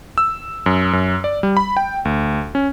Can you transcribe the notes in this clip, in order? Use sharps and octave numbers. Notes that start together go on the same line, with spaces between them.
E6
F#2
F#2
D5
G3
B5
G5
D2
C#4